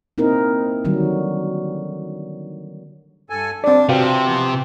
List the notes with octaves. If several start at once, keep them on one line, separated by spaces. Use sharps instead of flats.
A#3 C4 D#4 E4 A#4
D3 D#3 F#3 G3
G2 A4 G#5
G3 C4 D4 D5
C3 F3 C4 F#4 G4 B4 F5
E3 F3 B3